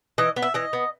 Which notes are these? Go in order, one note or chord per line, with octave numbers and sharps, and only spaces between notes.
E3 D#5
B3
E5
E3 D#5
B3